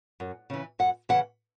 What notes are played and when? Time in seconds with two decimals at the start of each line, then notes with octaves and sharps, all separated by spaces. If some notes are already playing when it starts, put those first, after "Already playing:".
0.20 F#2
0.50 C#3 E3
0.79 F#2 F#5
1.09 C#3 E3 F#5